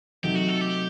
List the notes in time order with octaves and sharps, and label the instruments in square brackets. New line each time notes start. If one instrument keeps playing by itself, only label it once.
[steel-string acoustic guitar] C3 F#3 A3 D#4 [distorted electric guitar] G4
[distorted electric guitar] F#4
A4
G4